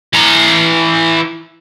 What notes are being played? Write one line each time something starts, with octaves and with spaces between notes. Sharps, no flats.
E3 A#5